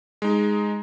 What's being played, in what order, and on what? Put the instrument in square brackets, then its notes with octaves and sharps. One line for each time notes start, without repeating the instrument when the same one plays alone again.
[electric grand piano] G#3 D#4